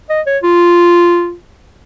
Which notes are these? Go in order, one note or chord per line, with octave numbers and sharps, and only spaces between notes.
D#5
C#5
F4